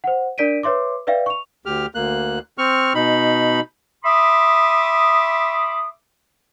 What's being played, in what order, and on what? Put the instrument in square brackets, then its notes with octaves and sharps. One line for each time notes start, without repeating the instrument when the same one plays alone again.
[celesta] C5 F#5
D4 A#4 D5 B6 D7 D#7
B4 C#5 E5 C6 D6
B4 D5 E5 F5 G5
C#6 F7
[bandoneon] D2 G4 F6
D2 A#3 F#6
C4 C#6 F6
B2 D#4 B5
[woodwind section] E5 B5 C6 D6 D#6